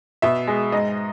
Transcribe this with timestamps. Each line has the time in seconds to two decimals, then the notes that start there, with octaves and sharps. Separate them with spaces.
0.22 B2 E5
0.47 G#3
0.72 G#2 D#5